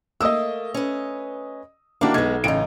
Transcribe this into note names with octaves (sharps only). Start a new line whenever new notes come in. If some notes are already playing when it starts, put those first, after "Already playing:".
A3 A#3 D#5 D#6 E6
C#4 B4
D#3 A#3 D4 E4 F#4
B1 G#3 B3 G#6
A1 C#3 D#4 D7